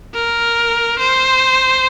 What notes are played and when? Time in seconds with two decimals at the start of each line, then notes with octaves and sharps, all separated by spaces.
0.14 A#4
0.99 C5